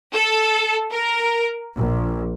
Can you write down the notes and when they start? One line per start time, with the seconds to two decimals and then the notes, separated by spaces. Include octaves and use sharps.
0.13 A4
0.92 A#4
1.76 A#1